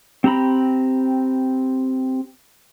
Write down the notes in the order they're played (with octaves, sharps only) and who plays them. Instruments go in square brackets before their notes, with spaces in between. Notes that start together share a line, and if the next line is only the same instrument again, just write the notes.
[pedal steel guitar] C4 G4 A#5 B5